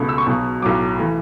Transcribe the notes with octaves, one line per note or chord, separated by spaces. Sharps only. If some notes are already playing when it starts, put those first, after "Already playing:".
Already playing: C#2 B2 A3
E6
C#6
B1 B2 F#3
B1 A2 F#3 D6
E3 A3